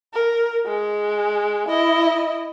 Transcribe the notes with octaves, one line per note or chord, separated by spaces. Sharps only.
A#4
G#3
E4 D#5